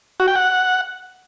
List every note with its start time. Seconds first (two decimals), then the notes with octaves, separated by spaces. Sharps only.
0.20 F#4
0.28 G5
0.35 F#5